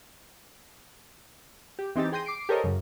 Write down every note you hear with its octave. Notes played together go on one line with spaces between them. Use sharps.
G4
E3 C4 D#4 G4 A6
G#4 G5 C6 G6 A#6 D#7
D6 C7 D7
G4 A4 A#4 C5 C#5 D#5
F#2 C#3